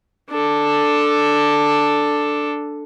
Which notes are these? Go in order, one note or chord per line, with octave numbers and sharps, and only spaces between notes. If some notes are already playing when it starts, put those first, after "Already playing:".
D4 A4